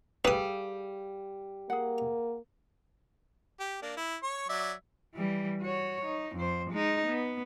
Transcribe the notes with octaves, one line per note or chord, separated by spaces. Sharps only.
G3 G#4 A4 B4 F5 D#6
A#3 G#4 F#5
G4
A#3 D4
E4
C#5 C#6
F#3 D5 E5
E3 G3
F#4 C#5
D#4
F2 C5
G#3 D#4
B3